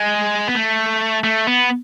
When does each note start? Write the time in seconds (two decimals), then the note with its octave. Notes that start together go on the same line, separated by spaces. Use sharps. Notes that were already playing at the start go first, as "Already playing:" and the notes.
Already playing: G#3
0.48 B3
0.55 A3
1.24 A3
1.47 B3